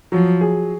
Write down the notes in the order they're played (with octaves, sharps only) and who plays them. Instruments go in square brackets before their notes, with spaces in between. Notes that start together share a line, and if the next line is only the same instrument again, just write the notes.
[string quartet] F3 [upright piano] F#3
[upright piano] G#4